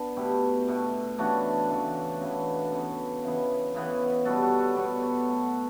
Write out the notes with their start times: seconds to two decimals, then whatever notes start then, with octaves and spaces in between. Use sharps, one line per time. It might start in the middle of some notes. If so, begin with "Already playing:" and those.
Already playing: B3 D4
0.17 B2 A3 E4 G4
0.68 B2 A3
1.18 C#3 E3 A3 D4 F#4
1.69 C#3 E3 A3
2.21 C#3 E3 B3 D4 F#4
2.72 C#3 E3 B3
3.23 C#3 E3 B3
3.75 C#3 E3 B3
4.25 B2 G3 B3 F#4 A4
4.42 F#4 A4
4.53 B4
4.59 A4 C#5
4.76 B2 G3 B3 D5
4.85 C#5
4.94 B4
5.02 A4 C#5
5.28 B2 F#3 A3